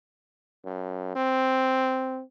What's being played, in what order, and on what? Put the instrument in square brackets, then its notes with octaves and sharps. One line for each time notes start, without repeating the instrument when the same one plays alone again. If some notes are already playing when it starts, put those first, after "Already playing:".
[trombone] F#2
C4